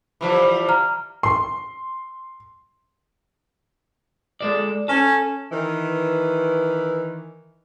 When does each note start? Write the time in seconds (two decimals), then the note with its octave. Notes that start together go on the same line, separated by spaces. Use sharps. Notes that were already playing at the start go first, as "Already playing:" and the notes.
0.21 E3 F3 G3
0.69 A#5 F6
1.23 C6
4.41 G#3 A4 D5
4.88 C#4 A4
5.51 D#3 E3